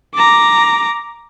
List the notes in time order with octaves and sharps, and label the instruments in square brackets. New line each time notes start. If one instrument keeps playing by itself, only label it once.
[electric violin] A#5 D6